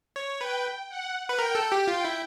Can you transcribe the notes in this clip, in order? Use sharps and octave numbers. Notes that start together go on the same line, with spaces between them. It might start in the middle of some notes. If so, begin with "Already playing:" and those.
C#5
B4 G5
F#5
B4
A#4 G5
A4
G4
F4 G5
E4